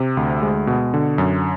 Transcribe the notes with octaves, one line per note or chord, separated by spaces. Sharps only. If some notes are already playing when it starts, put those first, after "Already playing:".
Already playing: C3
D2
G#3
B2
D3
F#2